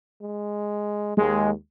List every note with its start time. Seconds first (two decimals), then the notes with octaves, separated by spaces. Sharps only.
0.22 G#3
1.17 D#2 G#3